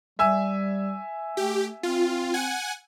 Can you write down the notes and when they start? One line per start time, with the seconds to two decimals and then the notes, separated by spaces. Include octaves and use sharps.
0.19 G3 E5 G#5 E6
1.37 A3 G4
1.83 C4 F4
2.34 F#5 G#5